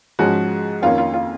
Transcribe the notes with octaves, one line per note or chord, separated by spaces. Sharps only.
G#2 F3 G#3 C#4 F#4
F2 D#3 A#3 C#4 F4
F4
F4